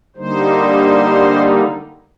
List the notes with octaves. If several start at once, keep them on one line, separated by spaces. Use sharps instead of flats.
D3 G3 A#3 D#4 C5